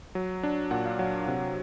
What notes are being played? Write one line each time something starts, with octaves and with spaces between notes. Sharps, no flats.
F#3
D4
A#2 F#5
F5
F#3 F#5
C3